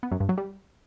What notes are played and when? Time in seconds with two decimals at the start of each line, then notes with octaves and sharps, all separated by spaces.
0.03 B3
0.12 F#2
0.20 G2
0.29 F#3
0.38 G3